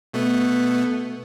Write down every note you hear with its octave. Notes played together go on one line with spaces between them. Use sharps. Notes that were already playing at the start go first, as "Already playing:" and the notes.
B2 A3 B3